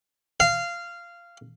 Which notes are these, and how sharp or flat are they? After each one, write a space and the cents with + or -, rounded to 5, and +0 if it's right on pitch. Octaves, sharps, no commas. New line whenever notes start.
F5 -15